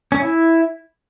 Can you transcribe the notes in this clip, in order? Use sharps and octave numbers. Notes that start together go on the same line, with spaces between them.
C#4
E4